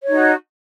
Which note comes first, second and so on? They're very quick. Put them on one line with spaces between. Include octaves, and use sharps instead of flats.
C#5 D#4 F#4